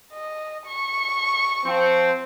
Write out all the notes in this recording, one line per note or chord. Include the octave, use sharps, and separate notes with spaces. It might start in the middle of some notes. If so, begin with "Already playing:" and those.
D#5
C#6
F3 C4